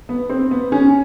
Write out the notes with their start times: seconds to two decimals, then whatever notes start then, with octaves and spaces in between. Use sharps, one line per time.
0.09 B3
0.29 C4
0.51 B3
0.72 C#4